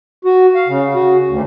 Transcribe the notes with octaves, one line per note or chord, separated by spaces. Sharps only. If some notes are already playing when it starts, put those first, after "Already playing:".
F#4
F5
C#3
F#4
D2